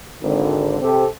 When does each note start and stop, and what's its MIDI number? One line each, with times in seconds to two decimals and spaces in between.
0.22 0.77 32
0.22 0.77 50
0.81 1.05 48
0.81 1.05 60
0.81 1.05 67
0.81 1.05 69